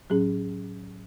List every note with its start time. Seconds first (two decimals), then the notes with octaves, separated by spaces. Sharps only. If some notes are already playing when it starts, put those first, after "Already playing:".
0.10 A2 F#3 C#4 G#4